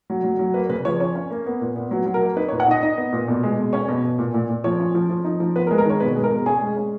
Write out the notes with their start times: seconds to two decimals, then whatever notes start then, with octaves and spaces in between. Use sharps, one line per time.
0.10 F#3
0.24 F#3
0.39 F#3
0.54 A#3 B4
0.69 C#3 B4
0.85 F3 C#5
1.00 C#4 C#5
1.15 C#4
1.31 A#3
1.46 B3
1.61 A#2
1.76 B3
1.91 F#3
2.06 F#3
2.14 A#4
2.22 A#3
2.36 D#4 B4
2.48 C#5
2.52 A#2
2.60 F#5
2.68 D#4 D#5
2.82 D#4 D#5
2.98 B3
3.13 A#2
3.28 B2
3.43 G#3
3.58 B2
3.73 C#4 C#5
3.88 B2
4.04 B2
4.19 A#2
4.34 A#2
4.49 A#2
4.64 F3 C#5
4.80 C#4
4.95 F3
5.10 F3
5.24 D#4
5.40 F3
5.56 B3 B4
5.67 A#4
5.71 G#3
5.78 A#4
5.86 D#3 C#5
6.00 B2 B4
6.16 G#3
6.24 A#4
6.32 B2
6.46 C#4 G#4
6.61 G#3
6.76 C#4